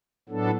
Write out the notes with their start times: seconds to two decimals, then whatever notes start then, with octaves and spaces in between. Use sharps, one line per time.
0.29 A2 F#3 B3 D4 A4